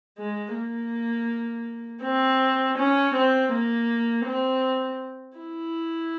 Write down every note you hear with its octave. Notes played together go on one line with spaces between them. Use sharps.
G#3
A#3
C4
C#4
C4
A#3
C4
E4